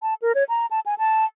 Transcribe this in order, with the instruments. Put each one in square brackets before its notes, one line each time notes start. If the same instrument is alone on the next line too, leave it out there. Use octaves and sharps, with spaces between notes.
[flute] A5
A#4
C#5
A#5
A5
G#5
A5